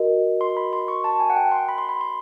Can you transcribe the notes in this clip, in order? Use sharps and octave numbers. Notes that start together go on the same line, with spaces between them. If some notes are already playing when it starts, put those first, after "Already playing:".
Already playing: F#4 A#4 D#5
C6
B5
C6
C#6
A5
G#5
F#5
G5
C6
B5
C6
B5
C6